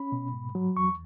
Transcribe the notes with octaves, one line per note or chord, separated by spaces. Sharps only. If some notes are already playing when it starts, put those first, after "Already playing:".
Already playing: C#4 B5
B2
G#2
F#3
E2 C#6